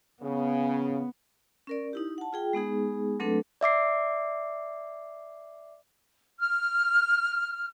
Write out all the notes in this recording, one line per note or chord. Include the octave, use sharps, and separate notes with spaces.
C#3 B3
C#4 A#4 D5
D#4 E4 G4
F#5 A5
F4 G#4 G5
G#3 B3 D#4 G#4
F#3 A3 C4 D4 A4 B4
D5 E5 D6 C7
F6